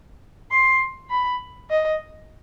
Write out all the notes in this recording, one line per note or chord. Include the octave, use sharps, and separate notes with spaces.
C6
B5
D#5